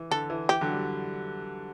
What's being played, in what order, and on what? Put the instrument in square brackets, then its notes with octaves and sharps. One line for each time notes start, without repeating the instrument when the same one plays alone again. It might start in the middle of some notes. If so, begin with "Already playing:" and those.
Already playing: [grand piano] E3
[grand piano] D3 [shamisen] A4
[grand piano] E3
[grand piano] E3 [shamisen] G4
[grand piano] D3 F#3
G3